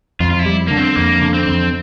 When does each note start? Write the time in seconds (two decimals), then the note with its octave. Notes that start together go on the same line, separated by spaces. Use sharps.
0.20 F2 F4
0.31 F4
0.39 E4
0.46 G3
0.68 D3 A#3
0.77 C4
0.96 F2 A#3
1.21 D3
1.34 C4
1.47 F2